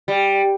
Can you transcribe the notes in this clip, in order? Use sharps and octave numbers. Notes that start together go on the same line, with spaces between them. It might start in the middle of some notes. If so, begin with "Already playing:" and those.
G3